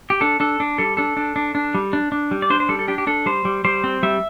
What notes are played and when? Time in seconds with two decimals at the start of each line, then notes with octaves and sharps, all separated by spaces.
0.10 G4
0.21 D4 A4
0.40 D4 A4
0.60 D4
0.78 G3 A4
0.97 D4 A4
1.17 D4
1.36 D4
1.55 D4
1.75 G3
1.93 D4
2.12 D4
2.31 G3
2.42 D5
2.50 D4 C5
2.60 C5
2.69 G3 A4
2.79 A4
2.88 D4 G4
2.98 G4
3.07 D4 A4
3.26 G3 C5
3.45 G3
3.65 G3 C5
3.84 C4
4.03 G3 E5